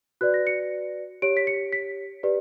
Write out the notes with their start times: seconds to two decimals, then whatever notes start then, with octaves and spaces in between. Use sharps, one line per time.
0.21 F#4 B4 D5 F#6
0.34 A#6
0.47 C#7
1.22 G4 C#5 D7
1.37 B6
1.47 C#7
1.73 B6
2.23 G4 B4 D5